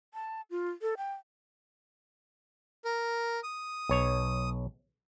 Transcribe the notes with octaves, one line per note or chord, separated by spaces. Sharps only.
A5
F4
A4
G5
A#4
D#6
B1 C#5